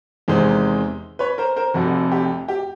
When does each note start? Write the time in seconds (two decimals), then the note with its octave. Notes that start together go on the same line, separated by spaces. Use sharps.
0.28 E2 C3 D#3 G#3 C4
1.19 B4 C#5
1.38 A#4 C5
1.56 A#4 C5
1.74 F1 F2 C3 F#4
2.12 G4
2.48 G4